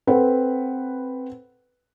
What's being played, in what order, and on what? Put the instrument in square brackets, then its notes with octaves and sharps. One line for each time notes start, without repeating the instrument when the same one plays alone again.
[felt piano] C4 A4 B4 C5 F#5